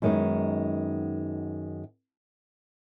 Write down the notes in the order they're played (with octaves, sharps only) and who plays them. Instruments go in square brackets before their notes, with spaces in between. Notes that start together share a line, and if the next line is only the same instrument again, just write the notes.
[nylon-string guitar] F#2 D#3 G#3 B3 D#4